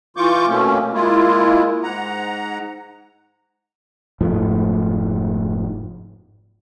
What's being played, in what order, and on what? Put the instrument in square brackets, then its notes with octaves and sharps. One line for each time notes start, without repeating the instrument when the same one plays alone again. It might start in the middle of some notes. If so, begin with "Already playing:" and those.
[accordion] E3 F4 C#6 D6 G6
B2 A3 A#3 C4 C#4
G#3 A#3 E4 F4
G#2 F#5 A#5
[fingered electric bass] F1 G#2 F3 A3